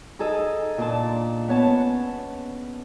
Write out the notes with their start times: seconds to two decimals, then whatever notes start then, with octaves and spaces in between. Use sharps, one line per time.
0.19 D#4 G#4 A4 D#5
0.78 A#2 D4 A5
1.48 B3 C#5 A5
1.67 C#4